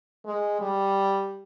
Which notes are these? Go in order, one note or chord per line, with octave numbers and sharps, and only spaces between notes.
G#3
G3